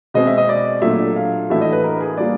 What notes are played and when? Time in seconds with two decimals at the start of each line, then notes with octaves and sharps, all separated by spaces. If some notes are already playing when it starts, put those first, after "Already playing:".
0.14 B2 G#3 C4 D#5
0.27 E5
0.38 D#5
0.49 D5
0.82 A#2 F#3 A3 D4 E5
1.16 F5
1.50 A2 E3 A3 D4 F#4 E5
1.61 D#5
1.73 B4
1.84 A#4
2.01 G#4
2.17 G3 A#3 D4 F4 G#4 D5